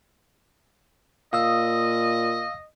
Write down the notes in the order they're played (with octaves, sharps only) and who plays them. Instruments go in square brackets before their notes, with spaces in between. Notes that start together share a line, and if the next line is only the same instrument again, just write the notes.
[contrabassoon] A#2 [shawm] D#5 [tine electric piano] F5 D#6 E6